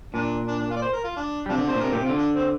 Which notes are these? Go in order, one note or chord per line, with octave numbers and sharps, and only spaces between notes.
A#2 D4
D4
D4
F4
D5
C5
A#4
F4
D4
G3
C3 F3 D4
D3
C3 C5
A#2
C3 A#4
A#2 G4
C3
D3 F4
D4
C4